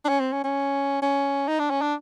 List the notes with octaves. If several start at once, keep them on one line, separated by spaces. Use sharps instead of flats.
D4
C#4
C4
C#4
C#4
C#4
D#4
D4
C#4
D4